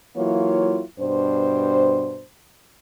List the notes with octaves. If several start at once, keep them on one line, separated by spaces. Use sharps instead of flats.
E3 F#3 A#3 E4 F4 C#5
G2 B2 D4 C5